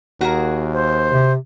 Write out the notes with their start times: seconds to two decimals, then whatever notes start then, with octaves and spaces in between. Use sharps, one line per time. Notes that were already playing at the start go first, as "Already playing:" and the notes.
0.21 D#2 F#4 G#4 A#4
0.73 C5
1.12 C3